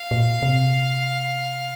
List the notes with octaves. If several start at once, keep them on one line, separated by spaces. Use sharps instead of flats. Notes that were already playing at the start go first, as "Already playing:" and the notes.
Already playing: F5
A#2
C3